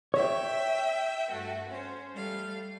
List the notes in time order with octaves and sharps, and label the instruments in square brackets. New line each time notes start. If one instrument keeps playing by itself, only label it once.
[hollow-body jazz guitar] C#5 [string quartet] E5 G5
[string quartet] G2 A3 F#4
C#4 C5
G3 A3 F5